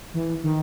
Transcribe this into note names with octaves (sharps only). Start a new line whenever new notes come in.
E3
D#3